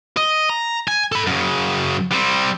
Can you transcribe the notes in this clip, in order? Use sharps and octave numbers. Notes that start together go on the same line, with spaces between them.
D#5
A#5
G#5
A4 B5
F#2 C#3
G3 C4